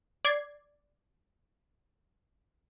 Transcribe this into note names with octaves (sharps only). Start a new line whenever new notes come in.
D5 G#6 C7